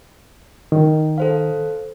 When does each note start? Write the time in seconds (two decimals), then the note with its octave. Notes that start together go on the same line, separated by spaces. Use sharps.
0.72 D#3
1.18 A4 C5 F5